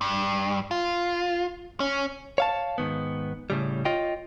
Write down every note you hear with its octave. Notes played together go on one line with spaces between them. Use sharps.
G2
F4
C#4
C#5 F5 A5
G#2 D#3 B3
A2 C#3 G3
F4 C#5 D#5 G5